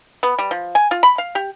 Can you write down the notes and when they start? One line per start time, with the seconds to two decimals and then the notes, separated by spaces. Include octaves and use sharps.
0.23 B3
0.38 G3
0.51 F3
0.75 G#5
0.91 F4
1.03 B5
1.18 F5
1.35 G4